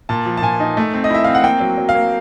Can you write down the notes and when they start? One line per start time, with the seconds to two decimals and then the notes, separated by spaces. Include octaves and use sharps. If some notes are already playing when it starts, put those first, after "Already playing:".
0.09 A#2 A5
0.26 F3
0.37 A5
0.42 A#2 G#5
0.60 D#4
0.77 A3
0.94 C4
1.04 D#5
1.10 E4 E5
1.24 C4 F5
1.35 F#5
1.44 A#3 G5
1.60 F#3
1.78 F#3
1.89 F5
1.95 A#3